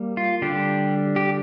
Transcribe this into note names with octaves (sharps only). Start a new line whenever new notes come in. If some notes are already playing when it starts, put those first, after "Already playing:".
Already playing: G3 A#3
F4
D3 G3 D4 G4
G4